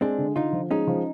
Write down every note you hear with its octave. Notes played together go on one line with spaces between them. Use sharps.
G#3 C4 D4
D3
D3 D#4 F4
F3
G#3 C#4 D#4
F3